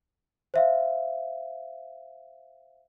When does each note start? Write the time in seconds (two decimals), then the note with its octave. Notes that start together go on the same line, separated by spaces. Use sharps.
0.54 C5 E5 F5